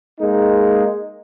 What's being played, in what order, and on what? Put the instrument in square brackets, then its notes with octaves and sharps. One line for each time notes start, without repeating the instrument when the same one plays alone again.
[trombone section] G#3 A#3 D#4